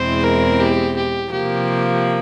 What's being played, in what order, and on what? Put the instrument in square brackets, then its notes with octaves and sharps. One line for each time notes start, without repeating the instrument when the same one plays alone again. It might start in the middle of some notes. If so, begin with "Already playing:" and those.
Already playing: [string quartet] E2 B2 G#3 C4 E4 [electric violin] C5
[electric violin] A#4
G4
G4
[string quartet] C3 F3 A#3 [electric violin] G4